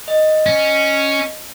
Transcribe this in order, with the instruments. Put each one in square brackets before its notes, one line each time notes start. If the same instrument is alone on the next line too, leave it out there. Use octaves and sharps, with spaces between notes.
[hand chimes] D#5
[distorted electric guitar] C#4